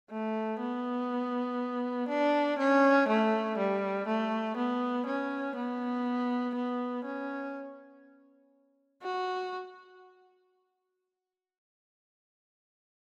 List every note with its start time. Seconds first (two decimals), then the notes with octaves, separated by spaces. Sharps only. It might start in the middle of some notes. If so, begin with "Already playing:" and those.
0.11 A3
0.60 B3
2.09 D4
2.59 C#4
3.08 A3
3.58 G3
4.07 A3
4.57 B3
5.06 C#4
5.56 B3
6.55 B3
7.05 C#4
9.03 F#4